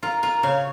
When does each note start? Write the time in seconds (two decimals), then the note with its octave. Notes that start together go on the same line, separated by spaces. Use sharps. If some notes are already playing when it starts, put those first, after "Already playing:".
0.03 F4 A#4
0.23 F4 A#4
0.43 C#3 C#5 F5